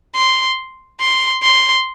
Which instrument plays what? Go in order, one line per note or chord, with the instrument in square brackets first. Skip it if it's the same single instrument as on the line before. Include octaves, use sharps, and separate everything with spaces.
[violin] C6
C6
C6